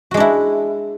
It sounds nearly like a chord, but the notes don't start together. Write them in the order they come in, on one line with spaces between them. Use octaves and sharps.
F#4 G#3 D4 E4